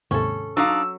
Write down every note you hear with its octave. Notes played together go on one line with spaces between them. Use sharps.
D#2 G#2 C3 C#4 A4
F#3 D4 D#4 F5 E6